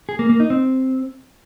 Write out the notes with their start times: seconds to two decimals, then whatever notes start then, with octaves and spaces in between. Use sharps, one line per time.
0.09 G#4
0.19 A#3
0.29 A#3
0.40 D#4
0.50 C4